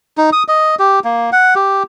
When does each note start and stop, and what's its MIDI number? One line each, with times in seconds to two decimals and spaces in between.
0.18 0.30 63
0.33 0.43 87
0.48 0.75 75
0.79 1.00 67
1.04 1.30 58
1.32 1.54 78
1.55 1.83 67